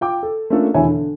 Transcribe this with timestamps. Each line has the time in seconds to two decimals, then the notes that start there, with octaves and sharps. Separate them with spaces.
0.01 F4 G5 D6
0.23 A4
0.50 A3 A#3 C#4 D4 F4 A4
0.74 E1 D3 E4 C#5 E5 G#5
0.87 D3